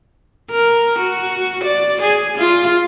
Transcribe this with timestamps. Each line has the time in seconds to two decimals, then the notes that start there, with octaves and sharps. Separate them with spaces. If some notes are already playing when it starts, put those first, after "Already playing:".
0.51 A#4
0.98 F#4
1.64 D5
2.01 G#4
2.38 F4